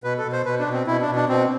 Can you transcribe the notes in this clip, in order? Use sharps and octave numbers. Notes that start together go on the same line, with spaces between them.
B2 B4
A4
B2
C5
B2 B4
D4
B2
C4
B2 E4
D4
B2
D4
B2 C4